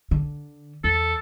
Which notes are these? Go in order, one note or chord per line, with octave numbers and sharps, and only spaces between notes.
D3
E2 A4